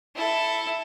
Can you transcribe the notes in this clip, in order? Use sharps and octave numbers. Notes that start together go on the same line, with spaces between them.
E4 A4